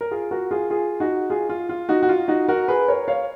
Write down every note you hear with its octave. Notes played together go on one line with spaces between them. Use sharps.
A#4
F4 G#4
F#4 A#4
F4 G#4
F4 G#4
D#4 F#4
F4 G#4
F4
F4
D#4 F#4
F#4
F4
D#4 F#4
F#4 A#4
G#4 B4
A#4 C#5
C#5 F5